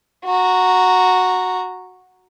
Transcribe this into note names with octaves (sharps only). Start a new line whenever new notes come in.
F#4 A#5